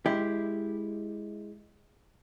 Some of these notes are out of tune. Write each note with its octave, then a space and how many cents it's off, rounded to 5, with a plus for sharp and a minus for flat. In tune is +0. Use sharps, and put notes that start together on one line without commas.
G#3 +0 E4 +0 G4 +0